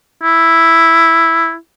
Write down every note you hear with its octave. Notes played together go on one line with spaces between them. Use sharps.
E4